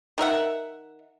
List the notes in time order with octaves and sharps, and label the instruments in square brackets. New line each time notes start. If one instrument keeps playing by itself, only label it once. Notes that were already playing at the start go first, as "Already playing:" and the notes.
[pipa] D#3 A#4 E5 F#5